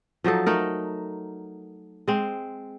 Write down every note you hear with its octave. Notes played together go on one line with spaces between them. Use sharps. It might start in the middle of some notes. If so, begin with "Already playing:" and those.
F3 F#3 D#4 A4
A3 D#4 A#4
G#3 C4